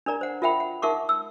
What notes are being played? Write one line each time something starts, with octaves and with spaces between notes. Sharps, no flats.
D4 A#4 D5 A#5
C5 F#5
F4 A#4 E5 F#5 G5 B5
F#5
D#4 A#4 E5 F#5 C#6 D6
E6